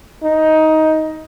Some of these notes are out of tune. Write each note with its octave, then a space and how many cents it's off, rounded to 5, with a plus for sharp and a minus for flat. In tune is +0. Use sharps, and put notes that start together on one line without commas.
D#4 +15